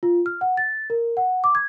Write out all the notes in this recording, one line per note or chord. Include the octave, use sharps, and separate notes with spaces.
F4
F6
F#5
A6
A#4
F#5
D6
G#6